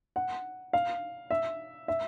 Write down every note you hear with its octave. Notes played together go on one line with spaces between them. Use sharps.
F#5
F5
E5
E5